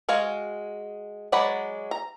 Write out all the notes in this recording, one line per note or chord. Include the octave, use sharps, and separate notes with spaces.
G#3 F#4 F5 G#5
F#3 G#3 D5 F#5 B5
A#5